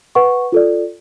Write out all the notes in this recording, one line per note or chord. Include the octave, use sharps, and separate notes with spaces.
B4 F#5 C#6
F4 A4 D5